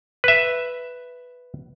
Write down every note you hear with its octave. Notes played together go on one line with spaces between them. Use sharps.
B4 E5